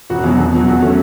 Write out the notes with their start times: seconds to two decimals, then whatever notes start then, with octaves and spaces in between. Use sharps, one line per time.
0.10 E1 F#4
0.24 E2 B2 F#3
0.39 E2
0.53 B2 F#3
0.67 E2 F#4
0.81 C#3 F#3 A3 C#4